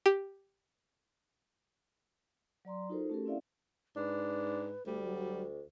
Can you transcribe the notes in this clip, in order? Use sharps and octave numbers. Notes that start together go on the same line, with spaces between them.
G4
F#3 D5 A#5 C6
D#4 F4 F#4 A4 A#4 C5
A3 C#4 F#4 G4 A4 A#4
C4 C#4 E4 D5 E5 F5
G#2 D4 B4
D2 G3 A3
F#3